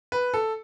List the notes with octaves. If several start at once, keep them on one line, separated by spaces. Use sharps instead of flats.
B4
A4